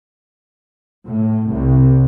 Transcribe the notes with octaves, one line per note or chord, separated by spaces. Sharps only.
A2
C2